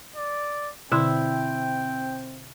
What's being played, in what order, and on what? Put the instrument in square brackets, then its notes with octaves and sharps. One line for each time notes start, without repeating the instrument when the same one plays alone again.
[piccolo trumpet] D5
[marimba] B2 D3 C6 [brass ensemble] C4 [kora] E4 [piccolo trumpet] G5